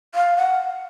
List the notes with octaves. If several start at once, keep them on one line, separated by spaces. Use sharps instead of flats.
F5
F#5